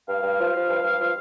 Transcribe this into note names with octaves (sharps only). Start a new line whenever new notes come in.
G2 F5
G2
F3
F3
G2
G2
F3